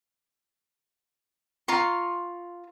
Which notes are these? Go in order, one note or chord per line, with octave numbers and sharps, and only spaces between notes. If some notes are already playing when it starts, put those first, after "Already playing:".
F4 A#5 C6 C#6